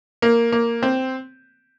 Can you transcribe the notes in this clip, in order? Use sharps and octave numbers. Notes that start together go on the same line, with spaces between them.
A#3
A#3
C4